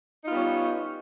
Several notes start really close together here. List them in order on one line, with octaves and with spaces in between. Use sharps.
D#4 F4 B3 G3 C#4